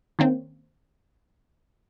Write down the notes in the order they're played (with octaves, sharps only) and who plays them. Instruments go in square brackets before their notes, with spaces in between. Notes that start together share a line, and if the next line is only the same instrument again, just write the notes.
[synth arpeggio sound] D#3 A#3 C4 C#4